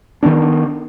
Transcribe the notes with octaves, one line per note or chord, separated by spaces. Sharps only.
D#3 F3 B3 D4